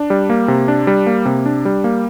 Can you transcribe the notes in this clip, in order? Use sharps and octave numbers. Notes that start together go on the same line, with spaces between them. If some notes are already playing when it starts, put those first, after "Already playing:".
Already playing: D4
G3
A#3
C3
D4
G3
A#3
C3
D4
G3
A#3